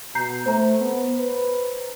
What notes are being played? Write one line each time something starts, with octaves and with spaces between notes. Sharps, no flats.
B2 A#5 G6 C7
A3 C5 A#5
B3
B4